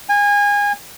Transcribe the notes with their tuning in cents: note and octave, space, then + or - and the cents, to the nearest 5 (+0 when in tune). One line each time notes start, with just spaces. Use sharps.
G#5 -25